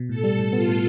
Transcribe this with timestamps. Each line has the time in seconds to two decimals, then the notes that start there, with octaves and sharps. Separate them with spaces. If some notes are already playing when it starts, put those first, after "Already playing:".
Already playing: B2
0.09 A2 A4
0.24 G3
0.39 A2
0.53 B3 F4
0.68 A2